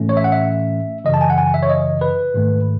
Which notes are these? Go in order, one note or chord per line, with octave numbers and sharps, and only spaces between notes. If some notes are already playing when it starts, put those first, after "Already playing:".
Already playing: A2 E3 A3 C#4
C#5
E5
F#5
E5
F#2 C#3 E3 D#5
A5
G#5
F#5
G#5
E5
C#5
D#5
B4
G#2 D#3 A3